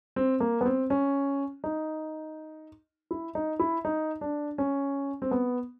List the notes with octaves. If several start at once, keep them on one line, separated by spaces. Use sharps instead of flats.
C4
A#3
B3
C4
C#4
D#4
E4
D#4
E4
D#4
D4
C#4
C4
B3